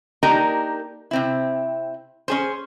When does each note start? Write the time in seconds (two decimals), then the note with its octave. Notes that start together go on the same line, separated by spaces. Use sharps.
0.23 A#3 D4 D#4 G4 A#4
1.11 C3 C4 E4
2.28 C#4 G#4 C5